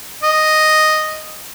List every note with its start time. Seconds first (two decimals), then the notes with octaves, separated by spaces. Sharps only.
0.24 D#5